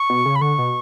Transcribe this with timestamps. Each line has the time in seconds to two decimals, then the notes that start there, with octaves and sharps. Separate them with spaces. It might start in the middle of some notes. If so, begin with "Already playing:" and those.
Already playing: C#6
0.10 B2
0.26 C#3
0.36 B5
0.41 D3 C#6
0.58 B2